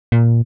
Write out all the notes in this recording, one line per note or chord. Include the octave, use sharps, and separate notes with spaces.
A#2